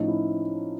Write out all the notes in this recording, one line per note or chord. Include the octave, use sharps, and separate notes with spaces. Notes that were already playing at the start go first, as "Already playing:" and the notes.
Already playing: A2 F3 A3 C#4 D#4
E4